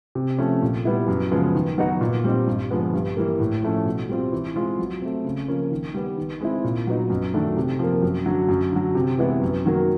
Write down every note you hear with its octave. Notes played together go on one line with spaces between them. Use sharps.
C3
F3 A3 C#4
A#2
G3 B3 E4
F#2
C#3 F3 G#3 B3
D#3
F#3 B3 D#4 F#4
A#2
G3 C4 D#4
G2
D3 F3 G#3 B3
G2
E3 G3 A#3
A2
F3 A3 C#4
B2
G3 C4 F4
E3
G#3 C4 F4
F#3
A3 C4
C#3
F3 A#3 C#4
D#3
G3 B3
D#3
G#3 C4 E4
A#2
F#3 B3 D#4
F#2
D#3 F#3 A3 D4
C3
F3 A#3
F#2
D3 F#3
F#2
D3 F#3
C3
E3 G#3 B3 E4
F#2
D#3 F#3 A#3